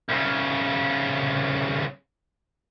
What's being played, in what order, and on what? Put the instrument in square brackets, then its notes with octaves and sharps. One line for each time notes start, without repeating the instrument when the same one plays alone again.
[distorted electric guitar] C2 C#3